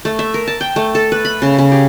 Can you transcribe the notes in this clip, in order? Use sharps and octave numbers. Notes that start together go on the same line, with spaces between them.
A3
E5
A#4
A5
G5
A3
A4
B4
B5
C#3
C#3
G4